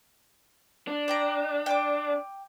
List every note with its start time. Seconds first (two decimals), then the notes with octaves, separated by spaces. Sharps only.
0.87 D4
1.08 D5 G5 A#5
1.66 G5 D6